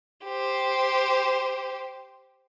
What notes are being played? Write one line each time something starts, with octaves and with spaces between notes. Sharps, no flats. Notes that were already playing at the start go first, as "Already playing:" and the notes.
G4 C5